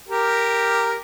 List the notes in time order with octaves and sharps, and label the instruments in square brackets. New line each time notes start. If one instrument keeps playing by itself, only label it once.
[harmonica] G4 A#4